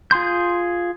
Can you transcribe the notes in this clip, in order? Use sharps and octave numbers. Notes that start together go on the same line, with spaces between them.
F4 G#4 C6 G6